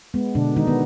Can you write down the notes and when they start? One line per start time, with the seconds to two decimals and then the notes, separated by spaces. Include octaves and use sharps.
0.14 G#3 B3
0.35 B2 D3 D4
0.56 D#3 G#3 D#4
0.67 B3